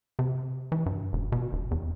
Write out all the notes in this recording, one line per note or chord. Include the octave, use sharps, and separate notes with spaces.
C3
E3
G2
E1
B2
E1
E2